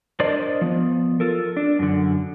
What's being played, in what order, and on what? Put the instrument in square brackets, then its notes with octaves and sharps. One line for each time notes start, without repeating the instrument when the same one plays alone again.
[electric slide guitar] D4 A#4 C5 D5 D#5
F3 B3
F4 A4 A#4
D4
F#2 D3